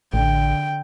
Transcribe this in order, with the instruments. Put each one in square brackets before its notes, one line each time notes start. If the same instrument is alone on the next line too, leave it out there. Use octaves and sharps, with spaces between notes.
[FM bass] A1 [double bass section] D3 [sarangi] G5